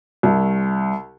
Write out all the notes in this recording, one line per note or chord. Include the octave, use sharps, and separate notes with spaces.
C2